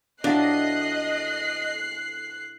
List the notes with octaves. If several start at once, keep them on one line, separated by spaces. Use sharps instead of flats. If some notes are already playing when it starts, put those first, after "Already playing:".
A2 F3 F#3 D4 D#5 F#6 C7